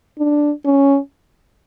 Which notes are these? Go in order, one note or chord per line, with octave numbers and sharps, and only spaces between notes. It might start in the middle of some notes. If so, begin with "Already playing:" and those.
D4
C#4